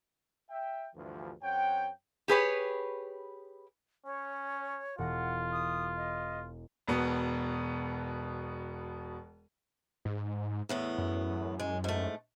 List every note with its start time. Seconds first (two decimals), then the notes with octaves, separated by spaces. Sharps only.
0.50 E5 G5
0.95 D2 G2 E3 F3
1.43 F#2 C4 C#5 F#5 G5
2.28 G4 G#4 B4 C#5
4.06 C#4 C#5
4.98 E1 F4 F#5 A#6
5.52 D#6
5.97 D#5
6.87 E1 B2 B3
10.05 G#2
10.69 E2 A2 B3
10.98 F#2
11.60 G#3
11.84 G#2 A3